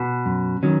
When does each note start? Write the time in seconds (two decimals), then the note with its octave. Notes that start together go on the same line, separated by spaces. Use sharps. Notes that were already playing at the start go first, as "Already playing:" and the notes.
Already playing: B2
0.26 F#2
0.63 D#3 F#3 C#4